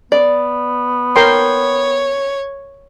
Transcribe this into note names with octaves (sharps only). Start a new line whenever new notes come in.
B3 D5
A#4 C#5 G5 C6